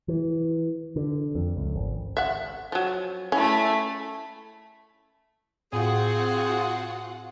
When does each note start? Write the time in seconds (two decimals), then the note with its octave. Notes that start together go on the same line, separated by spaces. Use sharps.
0.08 E3
0.96 D3
1.35 F2
1.57 C#2
1.76 G#1
2.17 E5 F#5
2.72 F3 F#3
3.32 A3 C#4 E4
5.73 A2 C4 F4 F#4 G#4 F#5